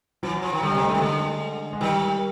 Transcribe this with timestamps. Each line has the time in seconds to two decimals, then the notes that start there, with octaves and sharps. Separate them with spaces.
0.23 E3 F#3
0.42 F3
0.53 D#3
0.62 D3 G3
0.72 C3 G#3
0.82 A3
0.89 C#3
0.92 D#3 G#3
1.01 D3
1.73 G#3
1.81 D#3 G3